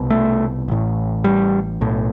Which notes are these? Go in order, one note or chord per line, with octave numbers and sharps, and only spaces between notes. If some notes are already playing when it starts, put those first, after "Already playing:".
Already playing: C2 B2
A3
A1 A2
G3
B1 A2